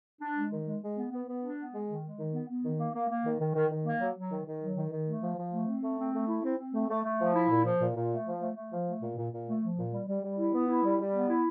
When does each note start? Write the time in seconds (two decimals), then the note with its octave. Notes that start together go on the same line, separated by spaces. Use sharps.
0.21 D4
0.36 G#3
0.51 D#3
0.66 G#3
0.82 G#3
0.96 B3
1.12 B3
1.27 B3
1.42 D4
1.57 B3
1.72 G#3
1.87 D#3
2.03 G#3
2.17 D#3
2.33 B3
2.49 B3
2.63 D#3
2.79 A#3
2.94 A#3
3.09 A#3
3.24 D#3
3.40 D#3
3.54 D#3
3.70 D#3
3.85 A#3
4.00 F#3
4.15 F#3
4.30 D#3
4.46 D#3
4.61 F#3
4.76 D#3
4.91 D#3
5.06 A3
5.22 F3
5.37 F3
5.52 A3
5.67 C4
5.82 A3
5.98 C4
6.12 A3
6.28 E4
6.43 C4
6.58 C4
6.73 A3
6.88 A3
7.04 A3
7.19 F3
7.34 E4
7.49 A#2
7.64 F3
7.79 A#2
7.95 A#2
8.10 A3
8.25 F3
8.40 A3
8.55 A3
8.71 F3
8.86 A3
9.01 A#2
9.16 A#2
9.32 A#2
9.46 A3
9.62 F3
9.77 A#2
9.92 G3
10.07 G3
10.23 G3
10.37 E4
10.53 B3
10.68 E4
10.83 G3
10.98 G3
11.13 B3
11.28 E4